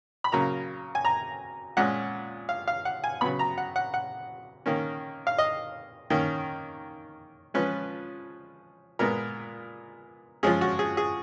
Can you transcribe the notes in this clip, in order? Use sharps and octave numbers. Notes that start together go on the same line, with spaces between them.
B5
C#3 F#3 A#3 A#5
G#5
A#5
A#2 G#3 C#4 F#5
F5
F5
F#5
G#5
C#3 F#3 B3 B5
A#5
F#5
F#5
F#5
D#3 A#3 C#4
F5
D#5
D#3 A#3 C#4
F3 G#3 C#4 B4
A#2 G#3 B3 A#4
F3 G#3 C#4 G#4
F#4
G#4
G#4